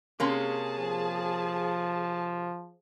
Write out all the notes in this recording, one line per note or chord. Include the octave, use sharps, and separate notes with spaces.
C3 A#3 C#4 G#4 A5
F3